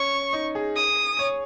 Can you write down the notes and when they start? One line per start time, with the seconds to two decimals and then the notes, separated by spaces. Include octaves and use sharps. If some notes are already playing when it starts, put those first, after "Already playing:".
Already playing: C#4 C#6
0.33 D#4
0.55 G#4
0.76 D#6
1.19 C#5